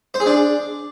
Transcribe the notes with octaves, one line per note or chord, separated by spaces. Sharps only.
C5
G#4
D4